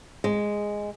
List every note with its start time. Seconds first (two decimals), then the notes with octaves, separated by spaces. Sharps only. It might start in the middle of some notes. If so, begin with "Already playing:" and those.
0.24 G#3